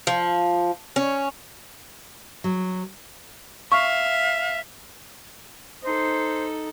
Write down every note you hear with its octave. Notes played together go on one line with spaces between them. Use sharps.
F3
C#4
F#3
E5 F5 C#6
D#4 A4 C5